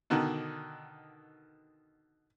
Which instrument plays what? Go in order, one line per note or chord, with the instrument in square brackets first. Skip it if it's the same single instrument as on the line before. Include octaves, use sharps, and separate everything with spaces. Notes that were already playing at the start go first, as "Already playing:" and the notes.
[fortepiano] B2 D3 D#3